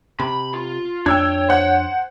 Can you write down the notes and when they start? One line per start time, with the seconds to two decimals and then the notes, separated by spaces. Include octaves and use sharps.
0.20 C3 B5
0.54 F4
1.06 F2 D4 C#5 G5 E6 G#6
1.49 C5 F#5 F#6